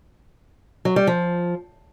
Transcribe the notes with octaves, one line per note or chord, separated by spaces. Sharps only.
F#3
G3
F3